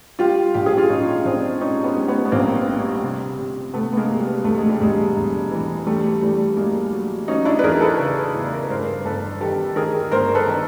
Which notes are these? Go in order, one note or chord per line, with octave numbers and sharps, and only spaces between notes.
G3 F4 G4
A#1 G4
G#4
F4 G4
A#1 C#4 D#4
A#1 C4 D4
G3 C#4 D#4
B3 C#4
G3
B3 C#4
B3
A#1 A#3 C4
G3
C3
C3
C3 A3 B3
B3
G#3 A#3
C3
G3
E1 A3
G#3
G3
E1 G#3
E1
E3
E2 G3 A3
E2 G3 A3
F#3 G#3 A#3
F#3
F#3 C#4 D#4
D4 E4
B4
E2 G#4 A#4
A4 B4
C#3
E2
A#4
B4
G2 A#4 C5
G1 A4 B4
D#3 G4 A4
D#3 G#4 A#4
G1 A#4 C5
A4 B4
D#3